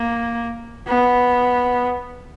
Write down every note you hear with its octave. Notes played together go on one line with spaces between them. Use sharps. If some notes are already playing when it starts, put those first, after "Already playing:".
Already playing: A#3
B3